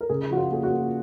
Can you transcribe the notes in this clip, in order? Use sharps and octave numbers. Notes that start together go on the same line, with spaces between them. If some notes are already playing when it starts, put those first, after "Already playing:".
A#4
C#3 G#4
F3 F#4
F4
A#3 G#4
F#4
A#3